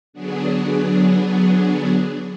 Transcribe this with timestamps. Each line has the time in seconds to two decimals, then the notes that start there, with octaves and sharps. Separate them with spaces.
0.13 D3 F#3 B3 D4 G#4